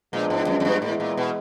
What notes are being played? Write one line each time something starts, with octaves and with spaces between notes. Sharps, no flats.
A#2 F3 G#3 B3 D4
G#2
F#2
F#2
G2
A2 E3 G#3 B3 E4
A#2
B2